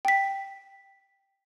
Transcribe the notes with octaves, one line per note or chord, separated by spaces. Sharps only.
G5 B6